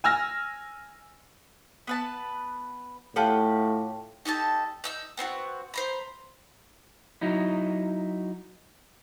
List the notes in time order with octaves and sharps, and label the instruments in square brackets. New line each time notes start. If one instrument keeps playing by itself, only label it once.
[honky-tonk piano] G#5 E6 F6 A#6
[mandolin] B3 B4 A5
[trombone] A2 [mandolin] F4 G4 F#5 [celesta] A4 G5 A5
[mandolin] D#4 G4 A4 A5
D#4 E6 G6
B3 C4 D#4 F#4
C5 A#5 B5
[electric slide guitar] F#3 D#4 E4